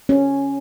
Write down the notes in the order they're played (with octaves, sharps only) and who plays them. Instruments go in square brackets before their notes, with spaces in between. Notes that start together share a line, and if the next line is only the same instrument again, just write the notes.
[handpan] C#4